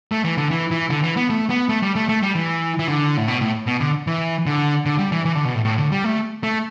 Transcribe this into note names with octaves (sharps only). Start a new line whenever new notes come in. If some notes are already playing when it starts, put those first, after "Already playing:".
A3
E3
D3
E3
E3
D3
E3
B3
A3
B3
A3
G3
A3
A3
G3
E3
E3
D3
A2
B2
A2
B2
D3
E3
D3
D3
G3
E3
E3
D3
B2
A2
A2
D3
G3
A3
A3